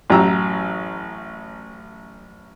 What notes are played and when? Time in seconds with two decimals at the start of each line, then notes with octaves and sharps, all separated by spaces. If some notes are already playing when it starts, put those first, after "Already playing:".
0.10 A1 F#2 A#5 E6